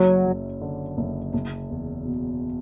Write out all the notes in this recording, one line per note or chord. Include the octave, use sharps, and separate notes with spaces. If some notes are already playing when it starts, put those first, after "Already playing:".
Already playing: F#1 F#3
F#2
D3
F#1
F#1
E2
B2